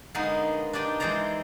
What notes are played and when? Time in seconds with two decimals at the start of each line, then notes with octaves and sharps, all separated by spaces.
0.15 D3 G#3 A#3 B3 D#4
0.73 D4 D#4 G4 D5 D#5
1.00 E3 G#3 D#4 C5 D5 A#5